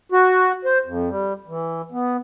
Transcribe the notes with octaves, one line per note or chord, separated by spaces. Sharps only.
F#4
C5
F2
G3
E3
B3